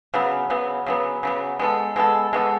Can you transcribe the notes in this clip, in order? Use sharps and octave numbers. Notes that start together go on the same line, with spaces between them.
C#3 F#3 B3
C#3 F#3 B3
C#3 F#3 B3
C#3 F#3 B3
G#3 B3 F#4 A4
G#3 B3 F#4 A4
G#3 B3 F#4 A4